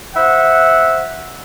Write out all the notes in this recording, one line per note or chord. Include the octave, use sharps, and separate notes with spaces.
C5 E5 F#5